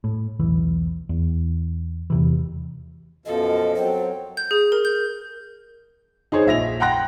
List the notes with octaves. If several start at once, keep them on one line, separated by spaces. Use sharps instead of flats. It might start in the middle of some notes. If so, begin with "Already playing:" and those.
A2
B1 E2 E3
E2
E2 C3 E3
F#2 B2 F3 A4 D#5
F#3 C4 C5
G6
G#4
A#4
G6
D#4 G#4 C5 C#5
A#1 E5 A#6 F7
F#5 G5 A#5 C6 F#6 A#6